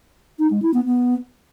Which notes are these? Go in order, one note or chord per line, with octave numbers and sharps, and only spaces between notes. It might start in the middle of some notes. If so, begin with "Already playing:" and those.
D#4
G#3
E4
B3
B3